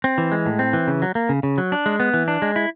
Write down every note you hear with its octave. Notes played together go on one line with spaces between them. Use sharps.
C4
E3
G#3
A2
C4
E3
C#3
F#3
A#3
C#3
C#3
F#3
D4
G#3
B3
E3
D4
G#3
E4